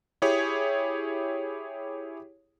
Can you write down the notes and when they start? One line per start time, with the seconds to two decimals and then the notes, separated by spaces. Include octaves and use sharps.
0.22 E4 G4 G#4 C#5